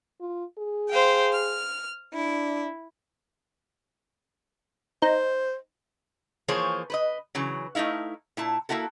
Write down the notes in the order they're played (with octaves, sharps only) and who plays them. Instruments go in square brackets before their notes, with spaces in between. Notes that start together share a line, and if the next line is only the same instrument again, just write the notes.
[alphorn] F4
G#4
[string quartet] C5 F5 G5
F6
[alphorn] D4 [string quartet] E4
[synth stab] D#4 [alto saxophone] C5
[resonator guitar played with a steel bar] E3 F3 A#3 G#4 C5 C#5
B4 C5 D#5
C#3 E3 F#3
A3 A#3 D#4 E4 F5
A#2 E4 A5
A#3 C4 E4 F#4 A4